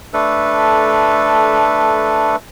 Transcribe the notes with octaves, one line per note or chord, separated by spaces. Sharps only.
A3 D4 A4 B4